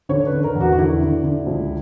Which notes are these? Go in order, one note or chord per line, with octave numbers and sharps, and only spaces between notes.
D3 C#5
B4
D3
A#4
E2
F#4
F#4
D3 E4
D3
D3
C#2